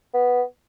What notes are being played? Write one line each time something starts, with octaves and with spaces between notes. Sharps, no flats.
B3